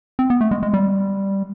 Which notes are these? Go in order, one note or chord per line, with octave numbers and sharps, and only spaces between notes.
C4
B3
A3
G#3
G#3
G3